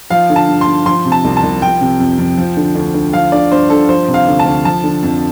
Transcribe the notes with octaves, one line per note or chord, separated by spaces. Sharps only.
F3 F5
D3
A5
G2
C6
G2
F3 C6
C3
A5
C2
A5
C2
F3 G5
C3
F2
F2
F3
D3
D2
D2
F3 F5
D3 D5
G2 C5
G2 A4
F3 C5
C3
F5
D2
A5
D2
F3 A5
D3
F2